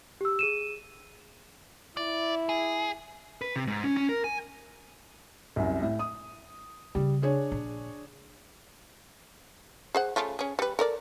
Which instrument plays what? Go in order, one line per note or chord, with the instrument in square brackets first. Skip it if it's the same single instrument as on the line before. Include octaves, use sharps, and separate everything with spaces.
[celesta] G4 E6
G#4 D#7 E7
[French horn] E4 [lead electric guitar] D5
[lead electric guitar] G#4
B4
C3
G#2
C#4
C#4
A#4
G#5
[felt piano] C2 F#2
A2
D#6
[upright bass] C#3 C4 [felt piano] G3
[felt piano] D4 G#4 C#5
[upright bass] A#1
[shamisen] G#4 C5 F#5
C#3 A3 F4
C#4 G#4
G3 B4
A4 A#4 D5